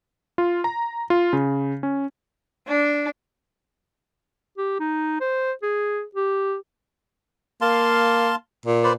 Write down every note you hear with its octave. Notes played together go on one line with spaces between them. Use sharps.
F4
A#5
F4
C#3
C#4
D4
G4
D#4
C5
G#4
G4
A#3 F5 A5 C6
A#2
B4 C5 D5